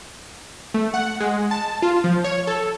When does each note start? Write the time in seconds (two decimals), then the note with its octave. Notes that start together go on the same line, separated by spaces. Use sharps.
0.74 A3
0.94 F#5
1.20 G#3
1.51 A5
1.82 F4
2.04 F3
2.24 C#5
2.47 A4